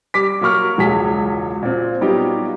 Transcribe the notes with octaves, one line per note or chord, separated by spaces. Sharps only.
G3 D6 B6
F#3 A#3 A#4 C#6 F6
E1 C#2 F#3 G#4 B6
A#2 C4
F#3 G3 B3 D#4 F4 G4